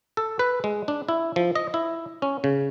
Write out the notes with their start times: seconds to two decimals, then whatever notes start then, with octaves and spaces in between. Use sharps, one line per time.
0.17 A4
0.39 B4
0.64 G#3
0.88 D4
1.09 E4
1.36 F3
1.55 D#5
1.74 E4
2.22 C#4
2.44 C#3